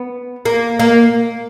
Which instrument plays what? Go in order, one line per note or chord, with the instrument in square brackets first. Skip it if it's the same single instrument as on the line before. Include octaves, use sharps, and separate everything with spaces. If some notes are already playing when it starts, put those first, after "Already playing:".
Already playing: [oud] B3
A#3
A#3